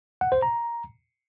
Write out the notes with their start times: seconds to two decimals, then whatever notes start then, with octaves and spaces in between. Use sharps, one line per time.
0.21 F#5
0.32 C5
0.42 A#5